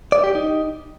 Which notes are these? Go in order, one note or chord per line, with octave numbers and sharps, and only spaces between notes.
D5
G4
D#4